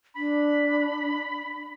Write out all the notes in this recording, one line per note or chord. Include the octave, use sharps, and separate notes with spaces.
D4 B5